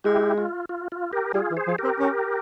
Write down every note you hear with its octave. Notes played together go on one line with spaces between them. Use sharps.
G#3 E4 G4
F4
F4
F4
G4 A#4
G3 F4 G#4
E3
G#4 C5
F3
G4 A#4
C4
C#4